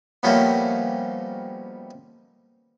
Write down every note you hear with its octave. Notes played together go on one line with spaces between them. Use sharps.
B2 F3 G3 A3 A#3 C#4